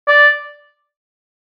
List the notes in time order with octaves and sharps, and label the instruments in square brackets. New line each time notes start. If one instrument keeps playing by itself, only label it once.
[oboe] D5